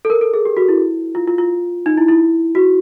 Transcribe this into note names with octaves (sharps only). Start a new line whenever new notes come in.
A4
A#4
A4
G#4
G4
F#4
E4
F4
F4
F4
D#4
E4
E4
F#4